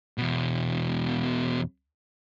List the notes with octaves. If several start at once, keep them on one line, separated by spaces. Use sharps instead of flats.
E2 B2